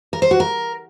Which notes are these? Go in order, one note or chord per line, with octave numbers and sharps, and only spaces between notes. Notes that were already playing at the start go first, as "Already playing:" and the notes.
A#4
C5
F#4
A#4